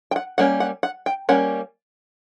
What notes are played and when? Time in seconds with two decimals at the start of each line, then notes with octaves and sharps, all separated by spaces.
0.11 G5
0.16 F#5
0.38 G3 A#3 C#4 F#5
0.60 F#5
0.83 F#5
1.06 G5
1.29 G3 A#3 C#4 F#5